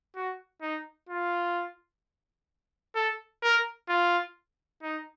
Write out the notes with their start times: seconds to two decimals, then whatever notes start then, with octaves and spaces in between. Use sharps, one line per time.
0.16 F#4
0.62 D#4
1.09 F4
2.95 A4
3.43 A#4
3.89 F4
4.83 D#4